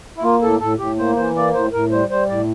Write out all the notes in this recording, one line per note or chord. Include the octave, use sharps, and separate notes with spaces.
E4
A#3 F4
A2 A4
A2 A4
A2 G4
A#3 C5
E3 C5
A#3 D5
A2 C5
A2 A#4
G3 C5
G3 C5
A2 D5